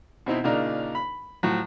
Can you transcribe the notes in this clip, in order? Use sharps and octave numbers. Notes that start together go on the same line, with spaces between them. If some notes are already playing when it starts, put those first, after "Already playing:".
B2 C4 D#4 E4
A#2 C#3 D4 D#4 A#4
B5
A2 F3 F#3